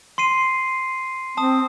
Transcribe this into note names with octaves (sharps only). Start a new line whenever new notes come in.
C6 C7 D#7
C4 A5 D#6